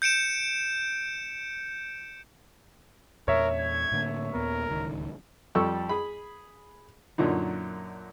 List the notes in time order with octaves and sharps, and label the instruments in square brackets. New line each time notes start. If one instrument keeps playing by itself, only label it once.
[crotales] G6 C#7 D7 E7
[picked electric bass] E2 A#2 [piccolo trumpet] A#4 [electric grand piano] C#5 E5
[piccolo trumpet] G#6
[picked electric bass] A2 D3 A#3
[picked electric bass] D#2 A#2 B3 [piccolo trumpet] A#4
[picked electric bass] D1 C#2 D#3
[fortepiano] F2 G3 A4 C#6 E6
G#4 B5
F#2 A#2 D3 F#3 D#4